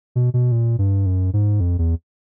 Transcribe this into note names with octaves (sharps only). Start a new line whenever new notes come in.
B2
B2
A#2
G2
F#2
G#2
F2
E2